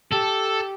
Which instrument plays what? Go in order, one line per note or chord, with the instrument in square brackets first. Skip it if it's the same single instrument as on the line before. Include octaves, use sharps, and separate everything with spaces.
[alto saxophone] G4 [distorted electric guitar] A4